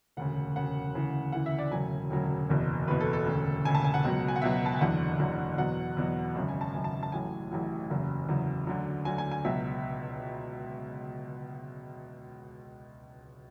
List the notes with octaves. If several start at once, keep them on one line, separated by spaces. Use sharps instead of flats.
E1 D2 C#3 F#5
E1 D2 C#3 F#5
D2 C#3 E3
D2 C#3 E3 F#5
E5
D5
E1 D2 C#3 F#3 G#5
E1 D2 C#3 F#3
F#1 E2 B2
F#1 E2 B2 B4
A4
A4
E1 D2 C#3
E1 D2 C#3 G#5
A5
G#5
F#5
C#2 B2 F#3
G#5
F#5
C#2 B2 F#3 E5
A5
G#5
F#1 E2 D3 F#3 F#5
F#1 E2 D3 F#3
E2 B2 F#3 F#5
E2 B2 F#3
G#1 F#2 C#3
G#5
A5
G#1 F#2 C#3 G#5
A5
A5
A1 A2 F#3 G#5
A1 A2 F#3
F#1 E2 C#3 F#3
F#1 E2 C#3 F#3
D2 D3 F#3
D2 D3 F#3 G#5
G#5
G#5
C#2 B2 F#3 E5